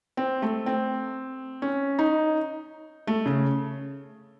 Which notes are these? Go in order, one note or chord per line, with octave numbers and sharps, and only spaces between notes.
C4
A3
C4
C#4
D#4
A3
C#3